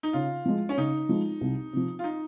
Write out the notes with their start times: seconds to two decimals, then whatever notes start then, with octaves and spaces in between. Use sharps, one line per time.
0.03 D#4
0.13 C#3 F4
0.45 F3 G#3
0.69 C#4
0.77 C#3 D#4
1.09 F3 G#3
1.41 C2
1.73 C3 F3
1.99 F4
2.04 D#4